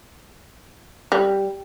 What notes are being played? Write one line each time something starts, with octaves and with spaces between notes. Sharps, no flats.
G3